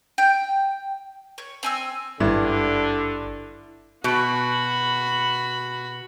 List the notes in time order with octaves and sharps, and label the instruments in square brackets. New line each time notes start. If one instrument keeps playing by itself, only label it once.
[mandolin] G5
C#5
C4 G#5 E6
[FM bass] G#1 [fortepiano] G2 [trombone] D3 [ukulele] E4
[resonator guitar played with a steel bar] B2 [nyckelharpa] F#4 B5